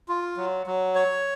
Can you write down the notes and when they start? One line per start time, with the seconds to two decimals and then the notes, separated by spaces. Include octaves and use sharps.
0.09 F4
0.37 F#3
0.67 F#3
0.95 C#5